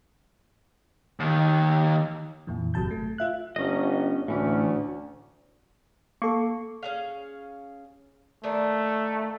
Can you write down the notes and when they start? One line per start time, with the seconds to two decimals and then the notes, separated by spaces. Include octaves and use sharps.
1.20 D#2 D#3
2.47 F2 A#2 E3
2.74 G1 C3 F#3 A5 G6
2.91 A3
3.18 F4 E5 F#6
3.56 G1 C#4 D#5
4.28 D2 A2 E3 C#4
6.22 A#3 A4 C#6
6.83 C#4 G#4 F5
8.44 D#3 A3 A#3 D4